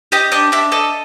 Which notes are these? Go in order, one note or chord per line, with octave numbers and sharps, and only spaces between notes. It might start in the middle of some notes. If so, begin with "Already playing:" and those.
G4 D#5
D4 D#5
D4 E5
A4 D#5